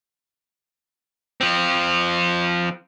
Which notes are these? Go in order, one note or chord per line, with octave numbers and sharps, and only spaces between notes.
F3 C4